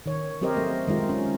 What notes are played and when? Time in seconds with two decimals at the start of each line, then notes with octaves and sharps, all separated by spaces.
0.06 D#3 C#5
0.41 F#3 C4 G4 A#4 C5 D#5
0.57 A3
0.87 D#3 G#3 D#4 F4
1.09 C#4